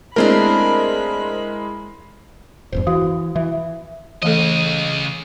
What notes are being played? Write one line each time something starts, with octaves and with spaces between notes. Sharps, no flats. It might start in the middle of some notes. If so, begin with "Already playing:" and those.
G#3 A3 C4 D4 E4 A#4 B5
D1 E2 G2 C5
E3 F#4 F5 D#6
E3 E5
C#3 E3 A3 A4 D#5